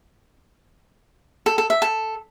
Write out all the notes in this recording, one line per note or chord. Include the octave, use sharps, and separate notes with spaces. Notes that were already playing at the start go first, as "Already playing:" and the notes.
A4
A4
E5
A4